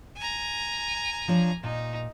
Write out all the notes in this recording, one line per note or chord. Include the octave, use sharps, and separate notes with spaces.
G#5 A#5
F3 D4 C#5
A#2 D#4